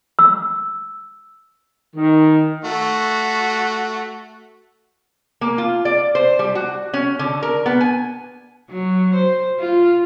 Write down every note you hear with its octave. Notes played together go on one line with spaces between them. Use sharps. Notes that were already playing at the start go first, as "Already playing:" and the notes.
E6
D#3
A3 F#4
A#3
F4
D5
C5
G3
F#4
C#4
D3
A#4
B3
G#5
F#3
C5
F4